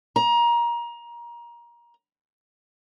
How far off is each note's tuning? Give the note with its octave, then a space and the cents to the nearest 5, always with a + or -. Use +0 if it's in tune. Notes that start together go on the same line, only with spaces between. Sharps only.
A#5 +25